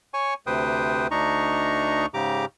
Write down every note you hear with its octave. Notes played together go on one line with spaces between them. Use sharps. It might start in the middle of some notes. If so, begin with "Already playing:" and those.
C#5 G#5 C#6
D2 C3 B4 C5 G5 D#6
D2 D4 D#4 D#5 A#5 C#6
G#2 C#3 G4 A#5 D6